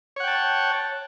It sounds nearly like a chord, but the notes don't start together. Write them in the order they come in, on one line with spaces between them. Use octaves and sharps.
C#5 F#5 G5 A5